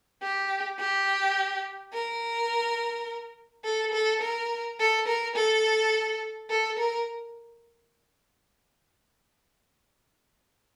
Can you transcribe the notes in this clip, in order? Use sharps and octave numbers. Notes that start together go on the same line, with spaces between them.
G4
G4
A#4
A4
A4
A#4
A4
A#4
A4
A4
A#4